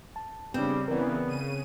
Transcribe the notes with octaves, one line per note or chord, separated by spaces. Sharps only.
A5
C#3 G3 B3 C4 D4
C#3 E3 B3 A#4 D5
C#3 D#7